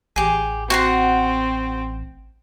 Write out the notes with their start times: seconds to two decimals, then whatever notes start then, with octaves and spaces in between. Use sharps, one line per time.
0.16 A1 G4 G#4
0.70 C4 F#4 F#5 C6